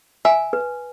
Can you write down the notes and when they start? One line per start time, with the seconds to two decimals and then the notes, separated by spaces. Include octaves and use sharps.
0.25 E5 G#5
0.53 B4